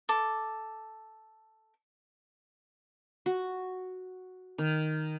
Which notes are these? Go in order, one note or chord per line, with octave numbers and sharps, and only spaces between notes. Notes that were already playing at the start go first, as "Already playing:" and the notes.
A4 D6
F#4
D#3